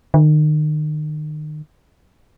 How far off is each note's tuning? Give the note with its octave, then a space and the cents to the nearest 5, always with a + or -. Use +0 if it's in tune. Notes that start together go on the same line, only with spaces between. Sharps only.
D#3 -35